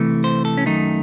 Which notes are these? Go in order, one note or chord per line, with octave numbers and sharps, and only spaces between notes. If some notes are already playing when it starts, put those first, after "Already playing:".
Already playing: C3 E3 A3
C5
A4
C#4
F#2 D#3 A3 D#4